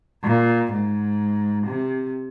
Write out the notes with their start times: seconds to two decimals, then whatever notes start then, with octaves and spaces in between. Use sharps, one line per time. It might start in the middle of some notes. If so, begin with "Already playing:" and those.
0.24 A#2
0.72 G#2
1.67 C3